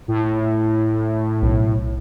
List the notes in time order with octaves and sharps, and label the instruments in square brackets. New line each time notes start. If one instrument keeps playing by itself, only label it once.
[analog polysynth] A2
[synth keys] B1